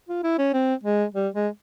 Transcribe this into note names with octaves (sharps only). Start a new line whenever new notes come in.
F4
E4
C#4
C4
G#3
G3
G#3